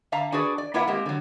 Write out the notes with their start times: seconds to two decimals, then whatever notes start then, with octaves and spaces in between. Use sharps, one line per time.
0.12 D3 E5 F5 A5 A#5
0.32 D4 F#4 G#4 B4 D5
0.58 D5
0.74 A#3 E4 F4 B4 E5 F#5
0.87 G#3 A#3 C4 G4
1.06 D3 F#3